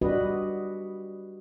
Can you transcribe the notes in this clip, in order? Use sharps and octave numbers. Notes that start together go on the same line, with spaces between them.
G3 D4 F#4 G4 B4 D#5